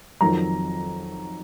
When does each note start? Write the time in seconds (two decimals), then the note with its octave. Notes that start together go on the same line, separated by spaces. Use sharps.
0.21 F2 D#3 F#3 A#5